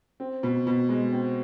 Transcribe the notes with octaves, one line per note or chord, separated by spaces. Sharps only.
C4
B2
B2
G#3
C4